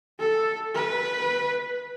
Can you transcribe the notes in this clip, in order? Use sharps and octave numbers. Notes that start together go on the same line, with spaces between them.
A4
B4